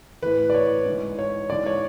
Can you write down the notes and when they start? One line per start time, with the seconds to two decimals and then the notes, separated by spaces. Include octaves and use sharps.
0.22 A2 E3 B4
0.50 D5
0.54 C#5
0.86 G#2 E3
1.19 C#5
1.50 G#2 E3 D5
1.66 C#5